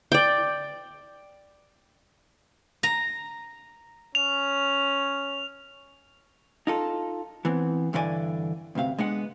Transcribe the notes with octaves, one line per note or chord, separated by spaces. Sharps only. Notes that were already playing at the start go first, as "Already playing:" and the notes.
D5 G5
A#5
C#4 F7
D#4 F4 A4
E3 B3 C4
G2 D3 E3 C5 D5 G#5
D2 G2 C3 F5
G#3 B3 D4 F#5